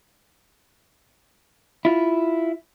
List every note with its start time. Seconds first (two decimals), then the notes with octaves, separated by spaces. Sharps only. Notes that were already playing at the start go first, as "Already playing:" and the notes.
1.85 E4 F4